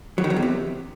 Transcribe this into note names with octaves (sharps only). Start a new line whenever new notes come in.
F#3
D#3
F#3
E2
C3